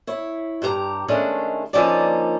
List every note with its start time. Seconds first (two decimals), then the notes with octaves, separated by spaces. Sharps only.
0.07 E4 C#5
0.62 G2 G4 A#4 A#5
1.08 D#3 G#3 A3 C#4 D4
1.73 D3 F3 A#3 C#4 D#4 D5